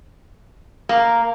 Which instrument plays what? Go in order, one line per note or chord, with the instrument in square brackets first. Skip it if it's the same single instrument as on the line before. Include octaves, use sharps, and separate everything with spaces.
[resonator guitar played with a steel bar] A#3